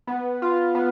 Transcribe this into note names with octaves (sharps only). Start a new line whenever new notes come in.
B3
F4
B3